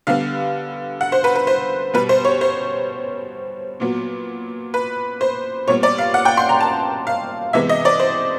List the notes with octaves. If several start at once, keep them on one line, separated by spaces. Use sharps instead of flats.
D3 G3 B3 F5
F#5
C5
B4
B4
C5
B2 G3 B3 B4
C5
C#5
C5
A#2 F#3 B3
B4
C5
A#2 G3 B3 C#5
D5
F5
F#5
G5
C6
A#5
A5
F5
C3 E3 G#3 B3 E5
D#5
D5
C5